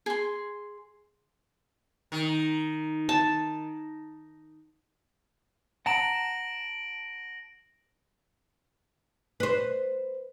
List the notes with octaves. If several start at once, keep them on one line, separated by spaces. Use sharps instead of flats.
G#4 C6
D#3
A5
F#5 A5 A#5 A#6 D7 F#7
B4 C5